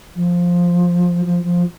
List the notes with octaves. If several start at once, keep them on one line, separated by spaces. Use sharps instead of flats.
F3
F3
F3